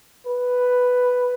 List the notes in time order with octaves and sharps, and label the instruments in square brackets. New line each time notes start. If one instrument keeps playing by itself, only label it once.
[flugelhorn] B4